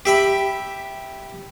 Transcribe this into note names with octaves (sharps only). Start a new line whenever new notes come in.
G4 E5 B5